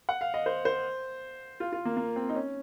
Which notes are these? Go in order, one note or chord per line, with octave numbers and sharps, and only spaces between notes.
F#5
F5
D#5
C5
C5
F4
F4
A#3
A#3
C4
D#4
C#4